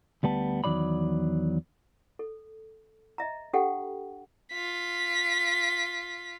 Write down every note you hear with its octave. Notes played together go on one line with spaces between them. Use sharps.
D2 G3 B3 A5
E2 D#3 F#3 D5 B5
A4
D#5 E5 A#5
D4 G4 A4 F#5 G5
F4 B6